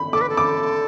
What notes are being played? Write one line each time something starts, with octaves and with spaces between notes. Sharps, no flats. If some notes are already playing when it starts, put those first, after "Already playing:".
Already playing: B5
A4 D6
B4
A4
D6